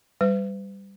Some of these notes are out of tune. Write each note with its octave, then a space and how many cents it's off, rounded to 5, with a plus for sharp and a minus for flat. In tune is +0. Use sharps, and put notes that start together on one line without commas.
G3 +0 B4 +45